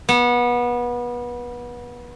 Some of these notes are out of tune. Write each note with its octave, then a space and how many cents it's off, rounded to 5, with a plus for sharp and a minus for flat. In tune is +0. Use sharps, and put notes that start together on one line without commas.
B3 -25